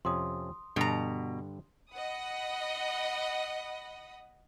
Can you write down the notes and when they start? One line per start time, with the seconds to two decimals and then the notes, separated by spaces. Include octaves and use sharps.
0.05 F2 C3 C#4 C6 D#6
0.76 G2 B2 D3 A#5
1.92 D#5 F#5 B5 D#6